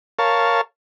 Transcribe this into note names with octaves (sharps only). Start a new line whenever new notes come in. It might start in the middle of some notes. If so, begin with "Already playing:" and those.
A#4 C#5 F5 A5